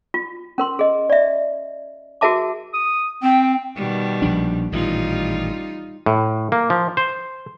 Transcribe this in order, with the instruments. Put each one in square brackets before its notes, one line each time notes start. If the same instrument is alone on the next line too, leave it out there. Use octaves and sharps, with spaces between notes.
[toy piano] F4
C#4 A#4 C6
G#4 D#5
D5 E5
F#4 G#4 A#4 E5 A5 D6
[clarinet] D#6
[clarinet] C4 [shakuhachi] G5
[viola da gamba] B2 D#3 G3
[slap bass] A#1 F3 D4
[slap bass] A1 A#2 D#3 [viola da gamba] G3 D#4 F4
[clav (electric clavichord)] A2
A#3
F3
C5